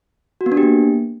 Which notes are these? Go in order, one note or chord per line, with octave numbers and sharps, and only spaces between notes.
F#4
B3
D4
G4
A#3